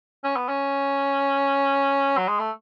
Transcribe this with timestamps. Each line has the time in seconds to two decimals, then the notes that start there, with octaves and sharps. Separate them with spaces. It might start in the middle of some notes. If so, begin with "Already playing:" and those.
0.24 C#4
0.36 B3
0.49 C#4
2.17 F#3
2.28 G#3
2.39 A3